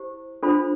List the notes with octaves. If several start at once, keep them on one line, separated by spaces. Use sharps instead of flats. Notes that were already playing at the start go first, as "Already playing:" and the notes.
Already playing: E4 G4 C5
D4 F4 A4 C5 B5